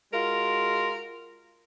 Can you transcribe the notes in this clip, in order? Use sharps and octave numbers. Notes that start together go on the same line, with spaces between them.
G#3 F4 F#4 A#4